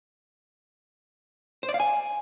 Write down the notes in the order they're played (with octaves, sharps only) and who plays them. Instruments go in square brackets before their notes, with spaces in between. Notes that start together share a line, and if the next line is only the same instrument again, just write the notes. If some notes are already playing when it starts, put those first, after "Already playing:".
[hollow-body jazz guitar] C5
D5
F5
G#5